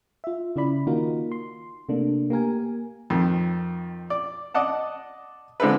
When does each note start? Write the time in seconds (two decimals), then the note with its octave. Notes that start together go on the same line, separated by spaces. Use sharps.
0.24 F4 E5
0.56 C#3 E4 D5 B5
0.87 D#3 A#3 D#4 F4 F#4 A#4
1.32 C6
1.89 C3 A3 A#3 D4
2.30 A#3 G4 A#4 G#5
3.10 F2 D#3
4.10 D5
4.54 D5 D#5 F#5 A5
5.60 D3 G#3 C4 A4 B4